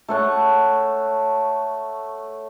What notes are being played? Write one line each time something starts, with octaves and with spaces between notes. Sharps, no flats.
A3 C#5 F#5